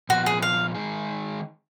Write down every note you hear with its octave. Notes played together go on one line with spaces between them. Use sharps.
A#2 F3 B3 F4 F#4
G#4
F5
D#3 G#3 D#4 G#4